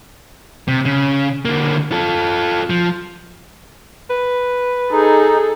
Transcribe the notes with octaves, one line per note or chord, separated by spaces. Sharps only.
C3
C#3
D3 A#3
F4 A4
F3
B4
D#4 G#4 A4